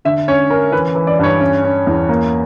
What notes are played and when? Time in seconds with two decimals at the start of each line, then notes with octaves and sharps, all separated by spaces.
0.05 D3 E5
0.28 C#4 C#5
0.50 C#4 A#4
0.72 E3 B4
0.95 E3
1.07 D5
1.19 G2 C#5
1.40 C#4
1.64 C#4
1.87 E2
2.09 A#3